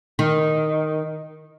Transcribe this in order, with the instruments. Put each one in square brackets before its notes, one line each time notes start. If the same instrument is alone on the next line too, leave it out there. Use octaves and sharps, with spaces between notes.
[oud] D#3